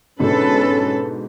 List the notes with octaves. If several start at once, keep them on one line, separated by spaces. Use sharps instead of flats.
G#2 B2 D3 C#4 A4 B4